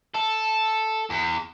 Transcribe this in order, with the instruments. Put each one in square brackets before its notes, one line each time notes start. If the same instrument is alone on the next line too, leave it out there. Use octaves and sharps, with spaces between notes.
[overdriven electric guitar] A4
E2